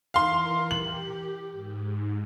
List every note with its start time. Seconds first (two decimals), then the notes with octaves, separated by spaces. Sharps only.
0.14 E3 A#4 F5 C6
0.71 G4 F#7
1.51 G#2